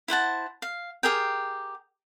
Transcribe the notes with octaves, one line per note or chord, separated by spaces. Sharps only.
E4 C5 F#5 A5
F5
G4 G#4 A#4 G5